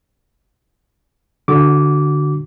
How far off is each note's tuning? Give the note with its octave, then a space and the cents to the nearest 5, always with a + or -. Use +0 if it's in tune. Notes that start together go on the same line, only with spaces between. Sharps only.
D3 +0 F#4 +0 D6 -20